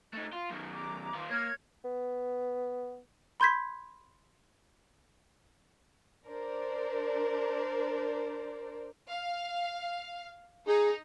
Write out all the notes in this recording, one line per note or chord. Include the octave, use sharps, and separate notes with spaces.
A3 D#4
F4
F#2 D#3
A#5 D6
D#3 F4
A#3 C#5 F6 G#6
B3
B5 C6 G6 G#6 B6
D4 A#4 C5 D5
F5
D#4 G#4